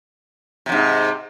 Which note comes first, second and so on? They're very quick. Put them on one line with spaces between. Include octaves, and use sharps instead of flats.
C3 F2 G#2